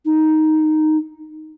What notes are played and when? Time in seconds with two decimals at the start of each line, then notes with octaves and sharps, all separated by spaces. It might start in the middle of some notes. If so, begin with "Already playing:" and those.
0.05 D#4